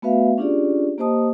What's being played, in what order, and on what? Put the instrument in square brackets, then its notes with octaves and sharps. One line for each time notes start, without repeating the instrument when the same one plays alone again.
[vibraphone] A3 B3 F#4 B4 E5 F5
C#4 D4 F4 G4 G#4 D5
A#3 G4 C5 D#5 A5 D#6